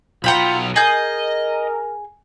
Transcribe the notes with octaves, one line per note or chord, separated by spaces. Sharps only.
B1 F4 F#5 G5 A#5 B5
G#4 A#4 D#5 G6